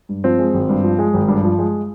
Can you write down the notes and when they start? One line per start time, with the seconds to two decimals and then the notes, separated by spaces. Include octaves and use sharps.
0.09 G2
0.24 F3 C4
0.39 G#3
0.54 G#1
0.69 G2
0.84 F3
0.99 G#3
1.14 G#1
1.28 G2
1.43 F3
1.59 G#3